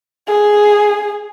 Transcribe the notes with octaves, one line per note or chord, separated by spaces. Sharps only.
G#4